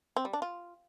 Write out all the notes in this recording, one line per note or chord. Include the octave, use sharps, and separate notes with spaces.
C4
G3
D4
F4